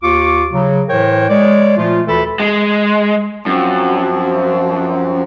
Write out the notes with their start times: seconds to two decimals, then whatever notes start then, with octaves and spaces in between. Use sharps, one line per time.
0.02 D#2 F4 C#6 D6
0.52 C#3 F#3
0.88 A2 E3 A#4 C5 C#5 G5
1.29 G#3 C#5 D5
1.77 A#2 F3 A3 F4
2.07 D2 E3 A3 A4 B5
2.40 G#3
3.46 F#2 F3 C4